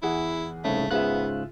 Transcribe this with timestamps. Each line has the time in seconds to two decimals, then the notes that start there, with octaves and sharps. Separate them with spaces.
0.03 E2 E4 G#4 F#5
0.64 C2 G#2 C#3 A3
0.91 G#2 C#3 B3 F4 G#4 E5 F#6